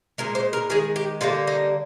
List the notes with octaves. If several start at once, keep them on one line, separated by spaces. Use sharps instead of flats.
A#2 G#3 A#4
C5
A#4
D#3 G#3 G#4
G4
D3 G3 A#3 F4
D#4